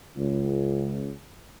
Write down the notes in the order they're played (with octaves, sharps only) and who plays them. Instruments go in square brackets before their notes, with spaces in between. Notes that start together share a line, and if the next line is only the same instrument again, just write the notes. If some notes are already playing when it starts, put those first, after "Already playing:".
[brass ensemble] C#2